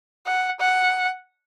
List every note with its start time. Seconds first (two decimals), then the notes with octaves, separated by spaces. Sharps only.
0.27 F#5
0.60 F#5